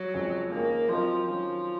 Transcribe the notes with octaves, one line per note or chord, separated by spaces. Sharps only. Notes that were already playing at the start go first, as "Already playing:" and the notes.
Already playing: F#3
F2 C#3 F3 G#3
D#3 G#3 A#3 C#4 F4 G#4
F3 F#3 C4 F4 A#4 D#5
D#3 F3 F#3 C#4